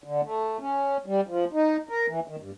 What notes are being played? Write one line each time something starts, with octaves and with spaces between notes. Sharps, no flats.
D3
A3
C#4
G3
F3
D#4
A#4
E3
D#3
G2